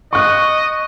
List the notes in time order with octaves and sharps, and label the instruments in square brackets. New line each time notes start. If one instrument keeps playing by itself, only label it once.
[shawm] D#5 [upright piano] C#6 F#6